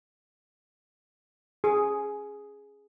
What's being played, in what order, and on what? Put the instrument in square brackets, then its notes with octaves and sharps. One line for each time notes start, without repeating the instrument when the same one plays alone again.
[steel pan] G#4